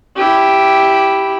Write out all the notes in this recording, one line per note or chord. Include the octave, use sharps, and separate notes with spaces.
E4 G4